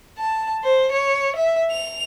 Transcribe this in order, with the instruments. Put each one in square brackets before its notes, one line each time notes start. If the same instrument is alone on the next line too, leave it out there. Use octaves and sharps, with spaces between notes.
[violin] A5
C5
C#5
E5
F7